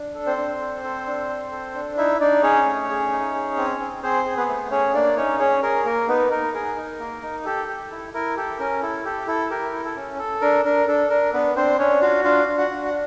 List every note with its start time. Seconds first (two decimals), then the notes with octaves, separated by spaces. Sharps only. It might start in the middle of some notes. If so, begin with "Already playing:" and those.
Already playing: D4
0.14 A4
0.26 C4 C5
0.37 D4
0.61 A4
0.84 A4
1.06 D4
1.29 A4
1.52 A4
1.75 D4
1.97 D#4 E4 E5
2.20 D4 D#4 D5
2.43 C#4 G#4 C#5
2.66 A3
2.89 G#4
3.12 D#4
3.35 G#4
3.57 C4
3.80 C4
4.03 C4 G#4 C5
4.26 G#4
4.37 B3 B4
4.49 A3
4.71 C#4 G#4 C#5
4.94 A#3 D4 D5
5.17 C#4 D#4 C#5
5.40 C#4 G#4 C#5
5.62 G#4 A#4
5.85 A#3 A#4
6.08 B3 D#4 B4
6.31 D#4 A#4
6.54 G#4 A#4
6.77 D#4
7.00 A#3
7.22 D#4
7.45 G4 A4
7.68 G4
7.91 E4
8.13 E4 A#4
8.36 G4 A4
8.59 C#4 A#4
8.82 E4 A4
9.05 G4 A4
9.28 E4 A4
9.50 G4 A#4
9.73 E4
9.85 A4
9.96 C#4
10.18 A4
10.41 D4 A#4
10.65 D4 A#4
10.87 D4 A4
11.10 D4 A#4
11.33 B3 D4 B4
11.56 C4 D4 C5
11.79 C#4 D4 C#5
12.01 F4 F#4 F5
12.24 D4 F4 F5
12.48 D4
12.58 F#4 F#5
12.70 D4
12.85 F#5